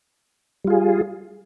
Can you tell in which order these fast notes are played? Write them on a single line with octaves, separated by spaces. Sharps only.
G3 F4 G#4